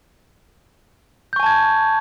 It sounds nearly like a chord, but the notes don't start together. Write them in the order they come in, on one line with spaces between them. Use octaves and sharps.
G6 C#6 G#5 A5 G#6